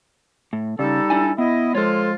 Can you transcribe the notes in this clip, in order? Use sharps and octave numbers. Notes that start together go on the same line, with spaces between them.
A2
C#3 G3 D#4 A4
D4 E4 G#5
B3 E4 D#5
F3 G#3 F4 A4 C#5